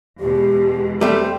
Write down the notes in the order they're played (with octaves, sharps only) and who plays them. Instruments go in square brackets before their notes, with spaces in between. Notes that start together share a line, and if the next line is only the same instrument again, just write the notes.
[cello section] E2 B2 G#3 [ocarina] G4
[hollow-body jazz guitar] G3 A3 C4 [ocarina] A4